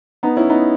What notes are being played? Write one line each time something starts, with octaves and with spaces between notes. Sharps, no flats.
B3 D#4
C#4 E4
B3 D#4